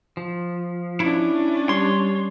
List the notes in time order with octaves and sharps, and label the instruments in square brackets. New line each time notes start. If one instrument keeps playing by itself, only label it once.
[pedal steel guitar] F3
[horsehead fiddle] C#4 D4 [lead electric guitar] E4
[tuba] G3 [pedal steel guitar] C#5 [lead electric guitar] C6